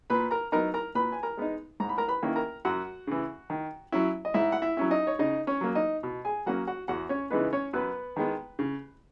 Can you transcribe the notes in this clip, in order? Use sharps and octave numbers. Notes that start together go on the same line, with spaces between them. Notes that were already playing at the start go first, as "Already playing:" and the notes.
A#2 B4 B5
A#4 A#5
F#3 B3 D#4 A#4 A#5
A#4 A#5
A#2 B4 B5
G#5
A#4 A#5
G#3 B3 D#4
G#2 A#5
B5
A#4 A#5
B4 B5
D#3 A#3 C#4 E4
A#4 A#5
F#2 F#4 F#5
C#3 E3
D#3
F#3 C#4 E4
D#5
G#2 E4 E5
F#5
E4 E5
F#3 C#4 E4
D#4 D#5
C#5
C#3 D#4 D#5
C#4 C#5
F#3 A#3
D#4 D#5
B2
G#4 G#5
F#3 A#3 C#4 F#4 F#5
F#4 F#5
E2 F#4 F#5
C#4 C#5
C#3 E3 G#3 B3 D#4 B4
C#4 C#5
F#2 B3 B4
D#3 G#3 B3
C#3